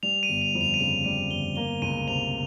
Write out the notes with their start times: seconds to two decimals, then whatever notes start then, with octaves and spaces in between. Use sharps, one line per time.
0.03 G3 F7
0.23 D#7
0.29 G1
0.42 F7
0.55 F2
0.61 F7
0.74 D#7
0.80 C#3 F7
1.05 G3 D#7
1.30 G1 G7
1.56 A#3 G7
1.82 C#2 D#7
2.07 C3 F7